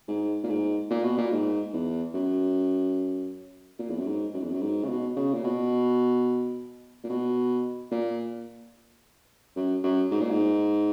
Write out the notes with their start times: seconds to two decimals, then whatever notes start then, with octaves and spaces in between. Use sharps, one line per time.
0.08 G#2
0.44 A#2
0.49 G#2
0.90 A#2
1.04 B2
1.18 A#2
1.32 G#2
1.73 E2
2.14 F#2
3.79 A#2
3.90 E2
3.99 F#2
4.07 G#2
4.34 F#2
4.43 E2
4.51 F#2
4.62 G#2
4.84 C#3
4.89 B2
5.17 C#3
5.34 A#2
5.44 B2
7.04 A#2
7.09 B2
7.91 A#2
9.56 F#2
9.84 F#2
10.11 G#2
10.21 A#2
10.30 G#2